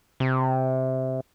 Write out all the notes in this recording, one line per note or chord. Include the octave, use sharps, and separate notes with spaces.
C3